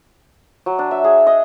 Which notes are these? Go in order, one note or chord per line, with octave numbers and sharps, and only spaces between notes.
F#3
D4
E5
G#4
D#5